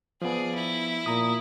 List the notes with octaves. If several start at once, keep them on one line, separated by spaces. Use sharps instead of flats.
F3 B3 G#4 D5
E4
A#2 A#5 D#6